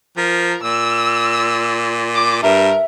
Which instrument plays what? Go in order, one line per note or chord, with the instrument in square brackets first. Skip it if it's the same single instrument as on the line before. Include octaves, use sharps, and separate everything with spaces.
[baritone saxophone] F3 [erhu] A#4
[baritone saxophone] A#2 [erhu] E6
[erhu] D6
[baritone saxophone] G2 [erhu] A#4 [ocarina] E5